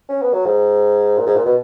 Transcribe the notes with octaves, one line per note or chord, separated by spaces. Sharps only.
C#4
B3
F#3
G#2
A#2
G#2
A#2
B2